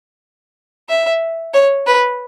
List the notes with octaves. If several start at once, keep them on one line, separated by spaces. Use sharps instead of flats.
E5
C#5
B4